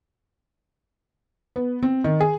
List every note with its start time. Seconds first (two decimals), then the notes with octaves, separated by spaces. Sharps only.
1.56 B3
1.83 C4
2.04 D#3
2.20 G#4